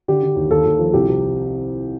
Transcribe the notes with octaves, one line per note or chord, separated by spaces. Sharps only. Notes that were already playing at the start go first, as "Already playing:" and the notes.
D3 G4
D3
D#2
D#2 A4
D#2
F3
C2 G4
C3